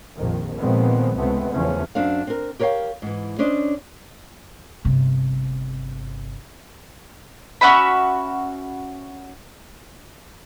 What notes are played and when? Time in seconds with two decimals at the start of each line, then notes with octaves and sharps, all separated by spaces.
0.15 A#1 F2 D#3
0.56 A#2 D#3 F3 G#3 B3 C4
1.17 C#2 C3 G#3 A3 B3 C4
1.51 E2 C#3 F3 A3 C#4
1.95 F#2 D4 C5 F5
2.27 C4 A#4
2.59 G4 A#4 C#5 D#5 F5 G5
3.02 G#2 E3
3.39 C#4 D4 C5 D5 D#5
4.85 G1 C3
7.61 C#4 F#4 E5 B5